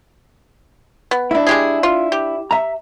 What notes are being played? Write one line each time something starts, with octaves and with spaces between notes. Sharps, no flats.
B3
D4 E4
G#3 G4 G#4
F4
G4
E5 A#5